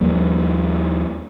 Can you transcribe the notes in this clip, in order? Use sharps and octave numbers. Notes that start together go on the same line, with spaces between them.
D#2 F3 G3 A#3